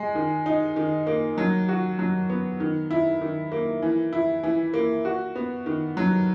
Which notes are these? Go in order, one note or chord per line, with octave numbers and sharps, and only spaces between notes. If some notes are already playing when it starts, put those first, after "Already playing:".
Already playing: G#3
D#3
D#4
D#3
A#3
F#3
F#4
F#3
B3
D#3
E4
D#3
A#3
E3
E4
E3
A#3
F#4
B3
D#3
F#3